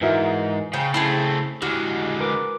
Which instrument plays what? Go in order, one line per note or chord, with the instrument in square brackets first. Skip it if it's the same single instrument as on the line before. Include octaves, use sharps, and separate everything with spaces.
[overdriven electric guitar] G#2 [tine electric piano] E3 A#4 [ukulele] E4 F#4 E5
[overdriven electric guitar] C#3 [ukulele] C5 G#5 A#5 [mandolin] G5
[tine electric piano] C#3 A5 B5 [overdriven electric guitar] A3 C4 [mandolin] E4 G4 G#4
[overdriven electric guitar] D3 G#3 [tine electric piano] E4 G4 F6 [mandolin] F#4
[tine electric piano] A#4 B4 D6